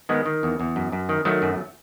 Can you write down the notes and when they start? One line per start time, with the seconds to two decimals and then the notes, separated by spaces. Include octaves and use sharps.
0.09 D#3 G#3 B3
0.26 D#3
0.43 E2
0.60 E2
0.76 F#2
0.92 F#2
1.09 D#3
1.25 D#3 F#3 A3
1.42 F#2